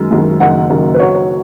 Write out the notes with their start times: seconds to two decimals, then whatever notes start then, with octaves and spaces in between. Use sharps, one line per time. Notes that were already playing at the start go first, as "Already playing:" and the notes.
Already playing: F#2 D#3 G#3
0.11 F#2 D#3 G#3
0.40 F#1 F#2 D#3 F#5
0.70 F#1 F#2 D#3
0.94 B4
1.00 B1 B2 F#3 C#5
1.15 C#5